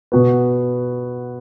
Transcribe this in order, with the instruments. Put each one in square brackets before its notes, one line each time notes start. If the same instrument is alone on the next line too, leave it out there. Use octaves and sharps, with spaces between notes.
[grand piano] B2 B3 F#4 B4